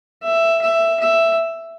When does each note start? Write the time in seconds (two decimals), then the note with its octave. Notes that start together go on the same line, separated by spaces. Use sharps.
0.22 E5
0.62 E5
1.00 E5